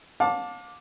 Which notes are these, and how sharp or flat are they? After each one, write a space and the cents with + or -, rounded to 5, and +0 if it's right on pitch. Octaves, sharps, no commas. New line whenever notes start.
F5 +40 A5 +0 D6 +0